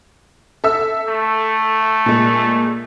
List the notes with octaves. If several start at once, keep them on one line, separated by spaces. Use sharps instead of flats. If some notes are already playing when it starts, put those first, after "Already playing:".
A4 E5 E6
A3
A#2 G#3